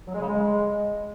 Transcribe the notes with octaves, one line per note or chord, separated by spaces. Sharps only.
F#3
G#3
C#3
G#3